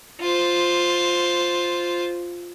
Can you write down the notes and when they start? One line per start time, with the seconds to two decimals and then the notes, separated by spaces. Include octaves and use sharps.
0.21 F4 C5